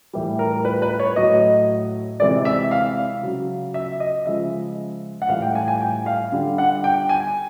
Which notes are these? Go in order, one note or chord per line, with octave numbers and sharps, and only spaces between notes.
A2 E3 G3
A#4
B4
B4
C#5
A2 F#3 D#5
C3 E3 G#3 D5
E5
F5
C#3 F#3
E5
D#5
C#3 F3 G#3 E5
F#5
A2 E3 G3 F5
G5
G#5
G#5
G5
F5
D3 G3
F#5
G5
G#5